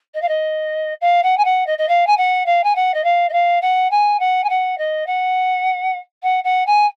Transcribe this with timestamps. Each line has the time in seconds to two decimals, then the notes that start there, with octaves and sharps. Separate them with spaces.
0.14 D#5
0.22 F5
0.28 D#5
1.01 F5
1.23 F#5
1.37 G#5
1.45 F#5
1.67 D#5
1.78 D#5
1.88 F5
2.07 G#5
2.17 F#5
2.46 F5
2.64 G#5
2.75 F#5
2.94 D#5
3.04 F5
3.29 D#5
3.33 F5
3.62 F#5
3.91 G#5
4.20 F#5
4.44 G#5
4.49 F#5
4.78 D#5
5.06 F#5
6.23 F#5
6.44 F#5
6.67 G#5